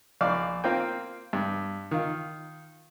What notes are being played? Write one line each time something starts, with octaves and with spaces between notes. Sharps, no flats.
A#1 D5 F5 F6
A#3 C4 F4 A#4 G5
G2
D#3 F4